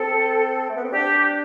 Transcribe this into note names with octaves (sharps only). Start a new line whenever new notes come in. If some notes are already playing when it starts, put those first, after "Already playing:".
Already playing: C4 A4
A3
B3
C4
D4 G4